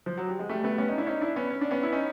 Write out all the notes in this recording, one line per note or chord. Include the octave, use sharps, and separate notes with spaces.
F3
F#3
G3
G#3
G3 A3
A3 B3
B3 C#4
C#4 D#4
D4 E4
C#4 D#4
D4 E4
B3 C#4
C#4
D4
B3 C#4
E4
C#4 D#4